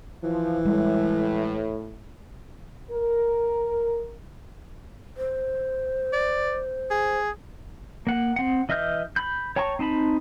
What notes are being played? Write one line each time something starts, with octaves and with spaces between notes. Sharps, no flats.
E3 F3
A2 G3 G#3
A#4
C5
D5
G#4
A#3 F#5
C4 F#5
E3 D#5 E5 F6 G6
B5 G6
C#5 G5 A5 A#5 C#6
C4 D#4 A5 B5